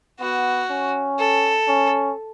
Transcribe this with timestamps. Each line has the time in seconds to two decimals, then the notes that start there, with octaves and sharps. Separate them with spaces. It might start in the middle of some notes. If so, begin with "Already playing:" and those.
0.20 B3 F#4
0.70 C#4
1.19 A4
1.68 C#4